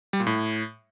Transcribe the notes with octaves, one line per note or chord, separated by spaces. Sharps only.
G3
A#2
A2